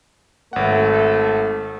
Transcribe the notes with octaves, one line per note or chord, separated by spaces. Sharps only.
G#1 A3 F#5